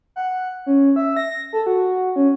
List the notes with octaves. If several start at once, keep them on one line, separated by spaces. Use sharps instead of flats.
F#5
C#4
E5
A#6
A4
F#4
C#4